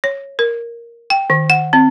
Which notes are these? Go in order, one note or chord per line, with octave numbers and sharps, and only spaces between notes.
C#5
A#4
G5
D#3
F#5
C4